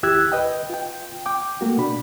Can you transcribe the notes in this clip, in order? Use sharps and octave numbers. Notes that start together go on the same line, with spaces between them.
D#2 E4 G4 E6 F#6 G#6
B4 D#5 G5
F4 G5
G5 D6
A3 A#3 F#4
B2 D4 B5